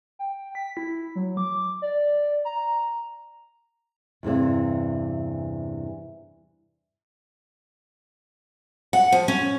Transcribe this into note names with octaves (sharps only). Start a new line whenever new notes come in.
G5
B6
E4
F#3
D6
D5
A#5
E2 G2 C3 E3
F#5
F3
C#4